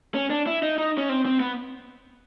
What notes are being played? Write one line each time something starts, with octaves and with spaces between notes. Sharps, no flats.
C#4
D4
E4
D#4
D#4
C#4
C4
C4
B3